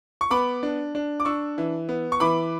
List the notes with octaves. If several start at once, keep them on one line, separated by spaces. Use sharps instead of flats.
C#6
B3 B5 D6
D4
D4
D6
D4 C#6 E6
E3
B3
C#6
E3 B5 D6